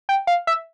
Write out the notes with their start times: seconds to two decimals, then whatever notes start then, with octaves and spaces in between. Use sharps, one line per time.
0.09 G5
0.27 F5
0.47 E5